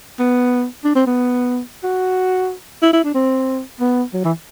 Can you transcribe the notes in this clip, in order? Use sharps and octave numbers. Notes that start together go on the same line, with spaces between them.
B3
D4
C4
B3
F#4
E4
E4
D4
C4
B3
F#3
E3